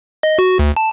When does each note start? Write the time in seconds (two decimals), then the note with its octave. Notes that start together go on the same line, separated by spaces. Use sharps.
0.23 D#5
0.39 F#4
0.59 D2
0.76 A5